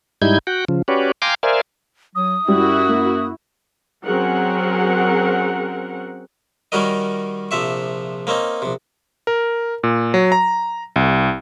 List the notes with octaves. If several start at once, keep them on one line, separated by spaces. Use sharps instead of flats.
G#2 G3 D#4 E4 G6 G#6
F#4 F#5 G5
C#3 F3
C#4 F#4 G4 B4 C#5 D5
F5 G5 G#5 A#5 C6 D6
A#4 C5 D5 E5 F5 G#5
F#3 D#6
F#2 G3 E4 F#4
A#3
F#3 C4 C#4 G#4 A#4 F#5
D#3 G3 C#4 F#4 A#4 D#5
A#1 C3 F3 E5 C#6
A#3 C4 C#4 D#4
A#1 C3
A#4
A#2
F#3
A#5
C2